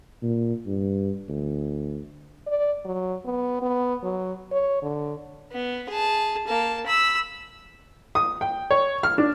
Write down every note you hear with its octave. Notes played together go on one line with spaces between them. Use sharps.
A#2
G2
D2
D5
F#3
B3
B3
F#3
C#5
D3
B3
G#4 A5
A#3 A5
B5 E6
D#6
G5
C#5
F6
D4